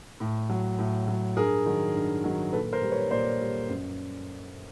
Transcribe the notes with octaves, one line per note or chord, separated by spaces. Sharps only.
A2
F#3
A2
F#3
G2 G#4 A#4
D#3 F#3
G2
D#3 F#3
A#2 A4 B4
A#4 C5
G3
B4 C#5
A#2 C5 D5
G3
F#2